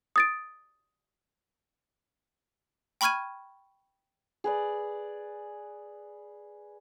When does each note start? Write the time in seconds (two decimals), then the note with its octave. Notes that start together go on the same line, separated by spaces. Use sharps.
0.16 D#6 A6 D7
3.01 G5 B5 C#6 F6 G#6 D#7
4.44 G#4 B4 D5